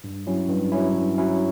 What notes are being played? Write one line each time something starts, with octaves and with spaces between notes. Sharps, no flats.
G2
F#3 C#4 E4
G2
F#3 C#4 E4
G2
F#3 C#4 E4